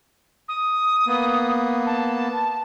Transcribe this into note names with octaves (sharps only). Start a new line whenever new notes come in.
D#6
A#3 B3
A5